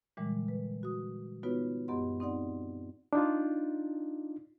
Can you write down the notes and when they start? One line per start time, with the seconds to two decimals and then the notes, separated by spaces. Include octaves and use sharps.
0.17 A#2 D3 E3 G3 G#3
0.48 B4
0.83 F#4 D#6
1.43 B3 D#4 F4 F#4 B4 C#5
1.88 F#2 B3 G4 D#5 F#5 C6
2.20 C4 D#4 D5 F#5
3.13 D4 D#4 F4